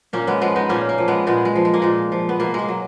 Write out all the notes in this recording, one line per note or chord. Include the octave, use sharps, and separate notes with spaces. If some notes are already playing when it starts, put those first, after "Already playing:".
A#2 A#3 C#4
G#3 B3
F3 G#3 B3
B3 D#4
A#2 A#3 C#4
A#3
F3
G#3 B3
A#2 G#3 B3
G#3
F3
G#3
A#3
A#2 G#3
F3
B3
B2 A#3
G#3 A#3
F#3